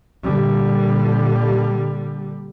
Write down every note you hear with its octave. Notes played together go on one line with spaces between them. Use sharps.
A#2 D3 G3